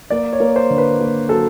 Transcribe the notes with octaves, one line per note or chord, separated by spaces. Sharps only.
A#3 D5
C#5
A#3
C5
D3
B4
A#3
F#3 A4